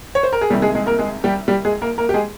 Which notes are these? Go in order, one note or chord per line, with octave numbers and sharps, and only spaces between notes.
C#5
C5
A#4
G#4
C2 C3 D#3 G3 G4
G#3 G#4
G#3 G#4
A#3 A#4
G#3 G#4
G3 G4
G3 G4
G#3 G#4
A#3 A#4
A#3 A#4
G4
G#3 G#4